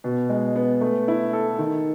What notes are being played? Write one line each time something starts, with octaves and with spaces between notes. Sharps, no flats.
B2
G#3
B3
A3
E4
A4
D#3